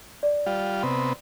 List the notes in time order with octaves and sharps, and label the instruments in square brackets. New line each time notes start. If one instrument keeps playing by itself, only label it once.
[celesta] D5
[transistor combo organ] G3 F4
C3 B3